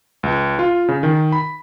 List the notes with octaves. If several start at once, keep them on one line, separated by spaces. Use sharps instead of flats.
C#2
F4
C#3
D#3
B5